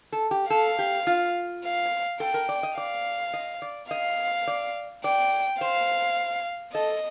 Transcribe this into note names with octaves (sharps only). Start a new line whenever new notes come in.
A4
G4
A4 F5
G4
F4
F5
A4 G5
A#4
D5
D#5
D5 F5
D#5
D5
D#5 F5
D5
D5 G5
C5 F5
A4 D#5